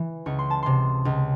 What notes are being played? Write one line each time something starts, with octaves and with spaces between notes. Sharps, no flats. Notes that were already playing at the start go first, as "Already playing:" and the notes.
Already playing: E3
C#2 C#6
C6
A5
C3 C6
C#2